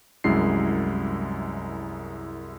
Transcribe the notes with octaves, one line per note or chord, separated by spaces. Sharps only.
C2 F#2 G#3 E4 C7